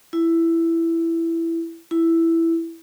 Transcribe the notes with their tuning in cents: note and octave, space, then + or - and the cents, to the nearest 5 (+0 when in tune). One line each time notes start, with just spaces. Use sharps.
E4 +10
E4 +5